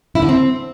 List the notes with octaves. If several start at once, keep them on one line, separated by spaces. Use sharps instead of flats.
E4
D3
C4